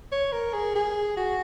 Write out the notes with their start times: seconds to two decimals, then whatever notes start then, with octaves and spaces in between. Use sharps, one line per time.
0.12 C#5
0.32 A#4
0.53 G#4
0.75 G#4
1.17 F#4